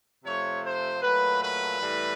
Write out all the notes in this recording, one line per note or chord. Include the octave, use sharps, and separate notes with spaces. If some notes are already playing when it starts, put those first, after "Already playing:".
C3 F3 A3 C#5
C5
A#2 F#3 A3 B4
B4
A2 E3 G3